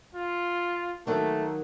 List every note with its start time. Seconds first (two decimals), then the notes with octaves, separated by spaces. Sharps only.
0.15 F4
1.07 D#3 F#3 A3 A#3